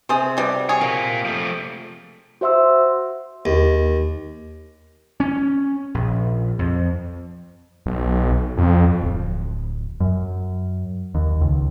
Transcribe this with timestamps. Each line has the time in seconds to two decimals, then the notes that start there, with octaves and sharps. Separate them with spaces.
0.09 C3 G#4 C5
0.37 B2 G3
0.69 G#4 C#5
0.81 A#3 F4 A#4
1.25 F3 A3
2.41 F#4 C5 E5 C6 E6
3.45 D#2
5.20 C#4
5.94 A#1
6.59 F2
7.86 B1
8.57 F2
9.02 D1
10.00 F#2
11.15 D#2
11.41 C#2